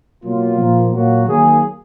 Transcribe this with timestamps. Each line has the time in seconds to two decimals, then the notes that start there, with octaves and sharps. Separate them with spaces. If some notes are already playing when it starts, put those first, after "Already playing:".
0.24 B2 F#3 A#3 F4
0.59 A#2 F3 A#3
0.93 A#2 F#3 A#3 F#4
1.27 D#3 F#3 A#3 G#4